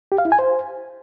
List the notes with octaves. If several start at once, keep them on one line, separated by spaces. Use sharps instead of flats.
G4
F5
E4
G#5
C5